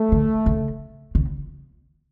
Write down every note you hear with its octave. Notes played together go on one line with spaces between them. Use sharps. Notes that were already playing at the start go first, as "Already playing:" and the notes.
Already playing: A3
D3
C#3
C#3